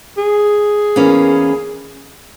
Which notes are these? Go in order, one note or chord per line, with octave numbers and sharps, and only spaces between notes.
G#4
E2 E3 A#3 C#4